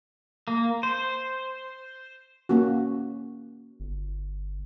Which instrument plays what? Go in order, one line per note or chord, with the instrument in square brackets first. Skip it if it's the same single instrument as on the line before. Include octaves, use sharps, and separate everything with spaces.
[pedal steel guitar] A#3
C5
[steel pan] A#3 C#4 F#4
[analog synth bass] G1